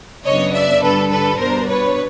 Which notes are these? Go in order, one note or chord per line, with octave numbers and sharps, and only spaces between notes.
F#2 C#3 F#3 B3 D4 C#5 D#5
D5 E5
G2 D3 G3 A4 B4
A4 B4
B2 G3 B3 D4 A#4 C5
B4 C#5